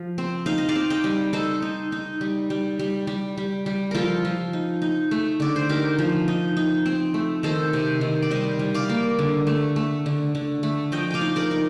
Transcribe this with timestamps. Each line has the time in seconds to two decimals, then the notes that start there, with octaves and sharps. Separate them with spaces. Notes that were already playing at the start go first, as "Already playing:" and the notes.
Already playing: F3
0.18 C4
0.46 D#4 F5
0.58 D#5
0.69 D5 F5
0.76 C4
0.90 D#5 G5
1.04 G3
1.33 D#4 A4 C5
1.62 D#4
1.92 D#4
2.21 G3
2.50 G3
2.79 G3
3.07 G3
3.37 G3
3.66 G3
3.91 F3 F4 A4 A#4
4.25 F3
4.53 D#4
4.82 D#4
5.11 A3
5.40 D3 D5
5.56 C5
5.69 D#4 G4 A#4
5.99 F3
6.28 D#4
6.57 D#4
6.86 C4
7.14 A3
7.43 D#3 A4 C5
7.73 C3
8.01 D#3
8.22 D5
8.31 G3 C5 D#5
8.59 G3
8.74 D5 F5
8.89 A#3
9.19 D3
9.47 A3
9.76 A3
10.06 D3
10.35 D3
10.63 A3
10.92 F3 D#5 G5
11.11 D5 F5 G5
11.21 D#4
11.36 A#4 D5
11.51 D#4